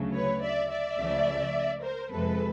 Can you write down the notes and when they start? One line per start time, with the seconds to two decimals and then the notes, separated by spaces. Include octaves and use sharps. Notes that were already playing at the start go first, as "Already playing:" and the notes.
Already playing: D2 C#3 F#3 A3
0.14 B4 C#5
0.42 D5 E5
0.71 D5 E5
0.98 C#2 C#3 F3 A3
1.83 A#4 C5
2.11 F2 C3 F3 G#3 A4 B4